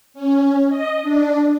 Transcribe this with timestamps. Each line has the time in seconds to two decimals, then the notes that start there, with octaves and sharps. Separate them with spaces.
0.14 C#4
0.69 D#5
1.02 D4